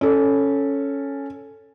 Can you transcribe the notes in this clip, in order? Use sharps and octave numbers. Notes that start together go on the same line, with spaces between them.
C#4 A4